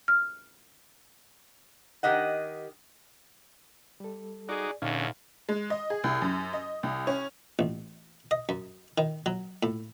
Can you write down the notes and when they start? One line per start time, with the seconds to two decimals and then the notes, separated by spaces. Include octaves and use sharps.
0.08 F6
2.03 D#3 G4 D#5 F#5
4.00 G3 A4
4.49 D#4 F#4 G#4 D5 D6
4.82 E2 A#2 D3 C#4 D#4 F5 F6
5.49 G#3
5.70 D#5
5.90 G#4
6.04 C2
6.22 F#2
6.53 D#5
6.83 C2
7.07 C#4
7.59 A1
8.31 D#5
8.49 F#2
8.98 D#3
9.26 F#3
9.63 A2